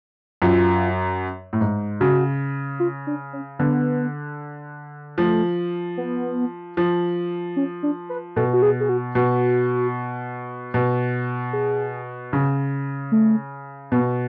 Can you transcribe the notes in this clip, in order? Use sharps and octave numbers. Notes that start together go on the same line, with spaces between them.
F#2 F4
A2
G#2
C#3 F#4
F4
D4
C#4
D3 B3
F3 A3
B3
F3
C#4
D4
B4
B2 A4
F#4
G#4
G#4
F#4
B2 F#4
B2
G#4
C#3
A3
B2 B3